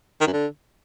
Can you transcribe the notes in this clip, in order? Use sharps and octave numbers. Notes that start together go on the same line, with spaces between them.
D#3
F#2
D3